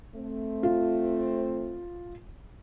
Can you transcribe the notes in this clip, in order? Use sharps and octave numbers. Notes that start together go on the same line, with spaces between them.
A3 C4
F4